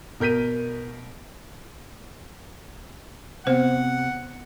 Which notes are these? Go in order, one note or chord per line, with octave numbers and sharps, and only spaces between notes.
B2 A#4 G6 B6 D#7
C3 B3 C4 C5 F#5